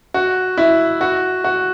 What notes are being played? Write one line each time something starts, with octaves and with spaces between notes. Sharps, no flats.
F#4
E4
F#4
F#4